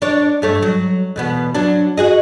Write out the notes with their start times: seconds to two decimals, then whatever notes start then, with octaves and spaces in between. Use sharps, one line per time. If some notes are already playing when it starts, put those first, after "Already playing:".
0.02 D4 C#5
0.42 G2 A3 C#5
0.62 F#3
1.16 E2 B2 B3
1.55 F#3 D4
1.97 F#4 G#4 D#5